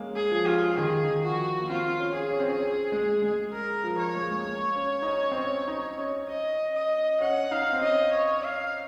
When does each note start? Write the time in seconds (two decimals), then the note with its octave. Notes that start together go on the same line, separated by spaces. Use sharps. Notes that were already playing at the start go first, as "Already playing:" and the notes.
Already playing: G#3 A#3 C#4
0.16 G#4
0.31 F3
0.47 F4
0.77 D#3 G#4
1.03 D#3
1.23 F3 F#4
1.60 A#3
1.69 C4 F4
1.99 C#4
2.15 G#4
2.31 C#4
2.40 C4
2.49 C#4
2.92 G#3
3.22 G#3
3.53 A#4
3.84 F3
3.99 C#5
4.15 G#3
4.23 A#3
4.32 G#3
4.45 A#3
4.76 C#4
5.02 D#4
5.06 C#4
5.32 C4
5.37 C#4
5.68 D#4
5.98 C#4
6.28 D#5
6.75 D#5
7.21 C#4 F#5
7.51 D#4 F5
7.73 C4
7.82 C#4 D#5
8.13 C#5
8.43 F5